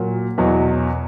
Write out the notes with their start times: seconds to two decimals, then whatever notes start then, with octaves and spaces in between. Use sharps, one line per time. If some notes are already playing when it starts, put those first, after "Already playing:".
Already playing: A#2 F#3
0.38 E2 B2 F#3